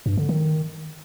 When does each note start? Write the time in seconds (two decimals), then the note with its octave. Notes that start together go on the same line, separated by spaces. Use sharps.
0.06 G2
0.17 D3
0.29 D#3